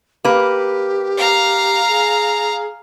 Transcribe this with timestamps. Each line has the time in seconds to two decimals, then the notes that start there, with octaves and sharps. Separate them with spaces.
0.25 A#3 G4 B4
1.17 F5 A#5
1.88 G#4